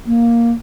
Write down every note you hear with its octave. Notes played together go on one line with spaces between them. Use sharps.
A#3